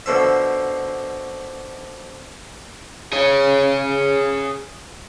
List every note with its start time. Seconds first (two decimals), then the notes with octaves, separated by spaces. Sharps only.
0.06 B2 D3 F3 E5
3.12 G#4 C#5